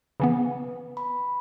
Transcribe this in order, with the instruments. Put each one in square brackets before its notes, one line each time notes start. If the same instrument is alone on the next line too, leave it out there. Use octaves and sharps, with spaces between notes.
[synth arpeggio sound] C#3 E3 B3 [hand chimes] B4
[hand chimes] B5